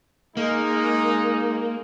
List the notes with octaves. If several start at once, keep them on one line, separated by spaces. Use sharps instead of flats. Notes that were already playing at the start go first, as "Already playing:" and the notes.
G#3 A#3 D#4